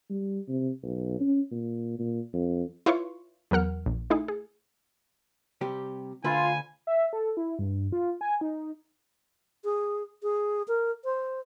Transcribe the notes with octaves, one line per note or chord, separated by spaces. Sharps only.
G3
C3
B1
C#4
A#2
A#2
F2
E4 F4 B4 C#5 C6 C#6
E2 F#3 A#4 F#5 F6
A#1
A3 D#4 E4 G#4
G#4
C3 G3 G4
D2 D3 F4 B4 G#5
E5
A4
E4
G2
F4
G#5
D#4
G#4
G#4
A#4
C5